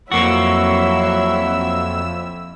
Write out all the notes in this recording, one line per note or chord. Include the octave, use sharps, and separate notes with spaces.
F2 F#3 A#3 E4 F#4 E5 E6